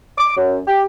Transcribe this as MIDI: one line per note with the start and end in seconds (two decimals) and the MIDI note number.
0.18 0.33 86
0.37 0.59 42
0.67 0.83 67